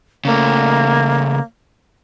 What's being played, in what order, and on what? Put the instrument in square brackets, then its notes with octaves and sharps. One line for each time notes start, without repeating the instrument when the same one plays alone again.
[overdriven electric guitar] C#3 A3 [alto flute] A#3